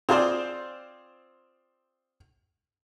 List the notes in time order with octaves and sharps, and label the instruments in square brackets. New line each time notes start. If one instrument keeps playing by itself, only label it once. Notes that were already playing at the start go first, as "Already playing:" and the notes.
[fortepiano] C4 F4 G#4 C5 D5